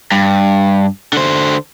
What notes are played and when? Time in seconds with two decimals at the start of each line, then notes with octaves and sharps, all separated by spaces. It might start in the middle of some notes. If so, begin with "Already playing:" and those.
0.12 G2
1.13 D3 C5